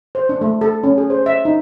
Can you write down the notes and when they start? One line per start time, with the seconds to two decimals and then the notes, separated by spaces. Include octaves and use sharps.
0.15 C5
0.29 D4
0.41 A3
0.61 A4
0.83 C#4
0.98 G#4
1.10 C5
1.26 E5
1.45 D#4